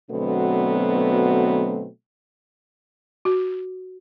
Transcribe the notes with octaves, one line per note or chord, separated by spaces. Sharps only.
B2 D3 F#3 A3 B3 C4
F#4